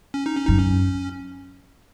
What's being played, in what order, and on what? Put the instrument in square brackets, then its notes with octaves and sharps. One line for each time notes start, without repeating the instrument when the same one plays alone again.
[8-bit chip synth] C#4
D#4
C#4
[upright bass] F#2 [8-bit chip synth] D#4
[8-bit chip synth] C#4